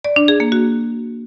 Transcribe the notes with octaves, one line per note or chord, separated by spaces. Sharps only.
D5
D4
G#4
A#3
F#4